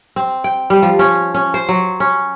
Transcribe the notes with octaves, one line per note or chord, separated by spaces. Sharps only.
C4
G5
G3
F3
C#4
C#4
C5
F#3
C#4